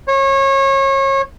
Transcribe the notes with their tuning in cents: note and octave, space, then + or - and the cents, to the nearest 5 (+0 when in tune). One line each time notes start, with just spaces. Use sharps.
C#5 -30